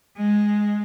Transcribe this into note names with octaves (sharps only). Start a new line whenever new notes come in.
G#3